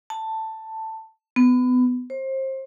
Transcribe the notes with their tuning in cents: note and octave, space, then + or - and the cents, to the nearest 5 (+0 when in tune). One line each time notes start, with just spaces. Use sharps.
A5 +10
B3 +25
C5 +30